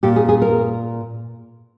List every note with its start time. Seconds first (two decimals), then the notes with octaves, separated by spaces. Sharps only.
0.03 A#2 G4
0.16 G#4
0.29 G#4
0.42 A#4